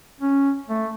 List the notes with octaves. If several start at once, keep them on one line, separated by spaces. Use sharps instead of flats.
C#4
A3